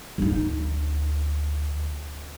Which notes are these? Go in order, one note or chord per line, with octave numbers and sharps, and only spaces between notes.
D2 D#4